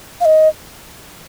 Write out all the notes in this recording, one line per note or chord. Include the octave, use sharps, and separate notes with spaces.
F5
D#5